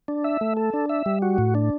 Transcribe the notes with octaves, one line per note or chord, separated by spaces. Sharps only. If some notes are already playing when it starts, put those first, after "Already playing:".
D4
E5
A3
A4
D4
E5
G3
F#4
A2
D4